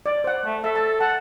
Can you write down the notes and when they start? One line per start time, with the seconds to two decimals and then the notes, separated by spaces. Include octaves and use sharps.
0.06 D5
0.24 C5 F#5
0.45 A3
0.64 A4 E5
0.75 A5
1.01 F#5 A5